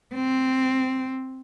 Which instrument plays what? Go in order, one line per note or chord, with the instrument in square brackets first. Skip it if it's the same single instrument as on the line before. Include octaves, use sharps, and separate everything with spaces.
[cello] C4